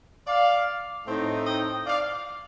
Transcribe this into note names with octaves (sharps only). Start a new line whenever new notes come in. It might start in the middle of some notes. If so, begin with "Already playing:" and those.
D5 F5
A2 A3 C4 D#4
D#5 G5
D5 F5